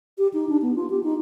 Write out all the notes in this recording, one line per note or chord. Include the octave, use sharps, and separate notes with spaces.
G4
D#4
D4
B3
F4
G4
D#4